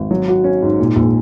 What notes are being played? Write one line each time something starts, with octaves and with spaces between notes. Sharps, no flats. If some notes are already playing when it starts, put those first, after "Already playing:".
Already playing: G#1
F#3
F#4
C#4
G#2
A#2
A#1